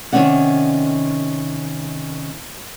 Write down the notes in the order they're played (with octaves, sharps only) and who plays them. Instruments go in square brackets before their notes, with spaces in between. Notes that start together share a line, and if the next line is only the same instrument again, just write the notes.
[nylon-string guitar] C3 D#3 B3 C#4 D5 F#5